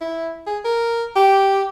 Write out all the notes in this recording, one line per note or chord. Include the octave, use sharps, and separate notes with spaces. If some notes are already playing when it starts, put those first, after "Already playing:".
E4
G#4
A#4
G4